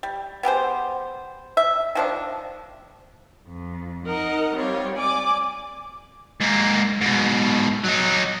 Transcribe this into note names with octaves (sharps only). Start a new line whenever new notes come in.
G3
B3 G4 G#4 C5
E5
D#3 F3 D4
F2
D#4 A#4 D#5 F#5
G3 C4 F4 C#5
D5 G#5 D6
G#2 A#3
G#2 B2
F#3 D#4